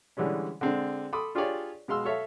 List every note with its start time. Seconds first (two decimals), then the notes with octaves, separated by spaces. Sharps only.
0.17 D3 E3 G3 G#3 C#4
0.61 D3 G#3 C4 D4
1.13 A4 B5 C6 D6 D#6
1.35 D4 F4 G4 G#4 C#5 D5
1.88 B2 G#3 F5 C6 E6
2.05 A4 C#5 E5 F5